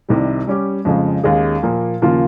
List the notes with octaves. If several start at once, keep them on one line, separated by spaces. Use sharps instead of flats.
C2 C3 D#3 G3
G3 C#4 G4
F2 C#3 F3 G#3
D#2 D#3 G#3 C#4 G#4
A#2 F3 A#3
D#2 C#3 F3 A#3 F4